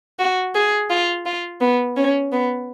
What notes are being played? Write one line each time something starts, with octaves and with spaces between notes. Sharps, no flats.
F#4
G#4
F4
F4
B3
C#4
B3